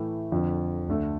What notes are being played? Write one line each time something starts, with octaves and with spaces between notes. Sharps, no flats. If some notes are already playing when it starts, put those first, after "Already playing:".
Already playing: A2 E3 A3 E4
F2 D3 F3
D2 D3 A3